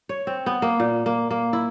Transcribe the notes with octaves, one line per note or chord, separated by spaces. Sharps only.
C#5
C4
B3
A#3
A#2
A#3
A#3
E4